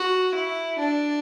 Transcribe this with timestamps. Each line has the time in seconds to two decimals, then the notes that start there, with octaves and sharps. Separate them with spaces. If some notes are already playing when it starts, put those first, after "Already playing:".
Already playing: F#4
0.34 E4
0.79 D4